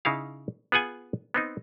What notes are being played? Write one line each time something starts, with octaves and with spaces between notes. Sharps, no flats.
C#3 D#4 E4 F5
B3 F4 G#4 F#5 G#5
B3 C4 D#4